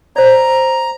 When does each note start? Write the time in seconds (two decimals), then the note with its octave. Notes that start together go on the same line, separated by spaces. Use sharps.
0.16 C5 D5 A#5